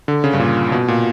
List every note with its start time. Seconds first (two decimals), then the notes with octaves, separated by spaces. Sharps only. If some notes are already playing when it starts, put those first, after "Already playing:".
0.08 D3
0.24 C#3
0.33 G2
0.39 A#2
0.72 B2
0.88 A#2